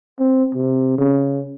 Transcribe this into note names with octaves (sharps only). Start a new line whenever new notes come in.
C4
C3
C#3